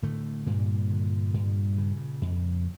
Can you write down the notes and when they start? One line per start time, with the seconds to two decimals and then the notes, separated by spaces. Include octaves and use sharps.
0.03 A2 D3 A3
0.46 G2 A#2 A#3
0.90 D3
1.34 G2
1.78 C#3
2.22 F2